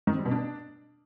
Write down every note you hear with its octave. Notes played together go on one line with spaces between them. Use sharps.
D#3
C4
G3
B2
D4